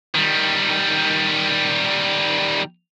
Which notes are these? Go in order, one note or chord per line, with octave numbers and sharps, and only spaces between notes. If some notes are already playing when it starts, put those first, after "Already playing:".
D#3 G3